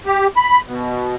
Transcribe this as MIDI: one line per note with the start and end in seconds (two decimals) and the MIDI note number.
0.06 0.27 67
0.37 0.61 83
0.67 1.16 47